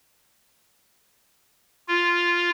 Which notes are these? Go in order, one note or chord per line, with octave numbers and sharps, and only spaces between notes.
F4